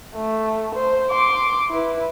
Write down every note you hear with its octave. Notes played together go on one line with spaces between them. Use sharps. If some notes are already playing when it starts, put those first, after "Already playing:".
A3
C5
C6 D6
E4 B4